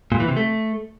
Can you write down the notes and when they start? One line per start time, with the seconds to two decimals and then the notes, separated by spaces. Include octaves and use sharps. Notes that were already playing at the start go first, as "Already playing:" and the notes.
0.12 A#2
0.20 E3
0.28 C3
0.37 A3